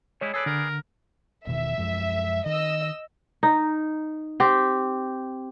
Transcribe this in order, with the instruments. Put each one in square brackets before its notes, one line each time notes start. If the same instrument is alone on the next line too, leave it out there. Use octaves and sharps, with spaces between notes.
[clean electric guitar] G3 G#3 E4 [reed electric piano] C#5
[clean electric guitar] G#4 B4 D5 [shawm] A4
[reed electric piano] D3 [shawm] A#4
[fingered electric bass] E1 B2 D#3 [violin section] E5
[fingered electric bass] F#2 F3 G#3
[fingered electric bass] D#3 [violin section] D#5 E6
[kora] D#4
C4 G4